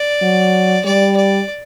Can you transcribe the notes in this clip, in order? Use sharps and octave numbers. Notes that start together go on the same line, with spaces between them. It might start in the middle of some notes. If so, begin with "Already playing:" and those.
Already playing: D5
F#3
G3 D5
D5